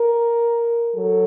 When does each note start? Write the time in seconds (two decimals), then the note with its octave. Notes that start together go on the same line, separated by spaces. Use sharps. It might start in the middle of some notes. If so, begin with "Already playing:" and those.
Already playing: A#4
0.95 F#3 A4